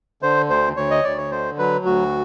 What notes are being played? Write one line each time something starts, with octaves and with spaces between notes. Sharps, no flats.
D3 C5
D2 C5
D2 C#5
D#5
D2 D5
C#5
D3 C5
F#3 B4
D2 F#4